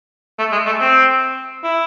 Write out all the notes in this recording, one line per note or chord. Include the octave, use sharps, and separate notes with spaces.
A3
G#3
A3
C4
E4